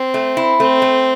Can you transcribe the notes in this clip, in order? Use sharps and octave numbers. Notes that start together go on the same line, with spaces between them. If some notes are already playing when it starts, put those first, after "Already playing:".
Already playing: C4
A3
E4
A3 C4
A3